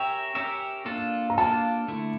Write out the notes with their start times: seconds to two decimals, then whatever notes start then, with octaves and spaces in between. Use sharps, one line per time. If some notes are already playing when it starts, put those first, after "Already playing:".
Already playing: C#4 G4 A#4 C#5 E5 G5
0.35 C#4 G4 A#4 C#5 E5
0.86 A#3 D4 F4 A4
1.30 A#5
1.38 A#3 D4 F4 A4 A5
1.88 D3 A3 E4